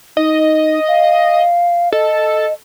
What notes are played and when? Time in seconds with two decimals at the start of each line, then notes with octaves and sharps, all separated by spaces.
0.17 D#4 D#5
0.88 F5
1.92 A4 D#5